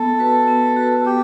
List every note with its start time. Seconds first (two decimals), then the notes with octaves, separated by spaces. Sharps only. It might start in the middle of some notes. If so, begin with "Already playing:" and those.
Already playing: B3 A4
0.19 F#4 B4
0.48 B3
0.76 F#4 B4
1.05 B3 G4